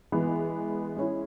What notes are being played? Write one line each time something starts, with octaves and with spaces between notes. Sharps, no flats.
E3 G#3 B3
G#3 C#4 E4